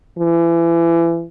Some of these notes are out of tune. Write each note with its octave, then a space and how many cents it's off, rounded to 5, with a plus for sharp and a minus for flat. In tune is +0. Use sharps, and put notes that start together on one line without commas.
E3 +30